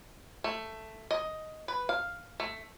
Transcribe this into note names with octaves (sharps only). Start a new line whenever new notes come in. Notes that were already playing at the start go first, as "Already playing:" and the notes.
A3
D#5
B4
F5
A3